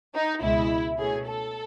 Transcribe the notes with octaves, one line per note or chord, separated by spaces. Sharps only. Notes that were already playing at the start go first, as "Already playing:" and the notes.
D#4
C#2 B2 G#3 E4
B2 A3 C#4 G#4
A4